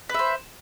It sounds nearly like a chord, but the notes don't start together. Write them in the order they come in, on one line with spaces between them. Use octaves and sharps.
B4 E5 C5